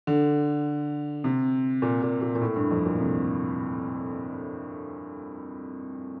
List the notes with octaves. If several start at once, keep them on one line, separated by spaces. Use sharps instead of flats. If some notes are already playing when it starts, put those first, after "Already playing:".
D3
C3
A#2
A#2
A#2
A#2
A2
G2
F2
A#2
C3